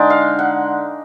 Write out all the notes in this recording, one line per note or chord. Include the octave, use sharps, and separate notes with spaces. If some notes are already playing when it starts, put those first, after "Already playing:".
Already playing: D3 G#3 D#4 D5
F5
F#5